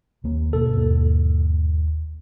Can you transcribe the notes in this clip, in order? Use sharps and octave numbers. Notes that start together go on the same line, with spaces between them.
D#2 A#3
G1 B2 A#3 A4
D#2